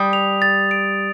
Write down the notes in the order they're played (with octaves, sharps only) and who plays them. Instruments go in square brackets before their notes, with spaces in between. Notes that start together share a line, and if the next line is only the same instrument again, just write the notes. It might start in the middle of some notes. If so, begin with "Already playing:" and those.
Already playing: [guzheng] G3 [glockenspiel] D#6
[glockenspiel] F7
A6
D7